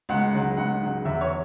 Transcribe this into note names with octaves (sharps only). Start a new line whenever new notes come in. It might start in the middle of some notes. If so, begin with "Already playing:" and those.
C#2 F#5
C#3 F#3
C#2 F#5
C#3 F#3
E2 E5
C#5